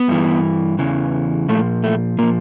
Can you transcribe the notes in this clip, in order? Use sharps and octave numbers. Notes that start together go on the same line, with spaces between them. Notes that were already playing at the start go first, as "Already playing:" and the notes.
Already playing: B3
G2 E3
E2 C#3 E3
A#2 F3 A3
A3
A#2 F3 A#3